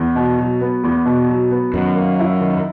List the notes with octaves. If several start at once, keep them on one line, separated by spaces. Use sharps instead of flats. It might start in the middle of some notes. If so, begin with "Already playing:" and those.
Already playing: E2
B2
F#3
B3
E2
B2
F#3
B3
F#2 D#3
A#3
E4
D#3